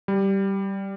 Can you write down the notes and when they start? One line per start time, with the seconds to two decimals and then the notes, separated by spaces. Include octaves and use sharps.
0.08 G3